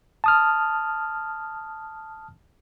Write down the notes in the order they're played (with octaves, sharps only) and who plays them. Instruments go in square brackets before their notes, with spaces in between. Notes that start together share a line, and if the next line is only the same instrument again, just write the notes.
[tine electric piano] A5 D#6 F6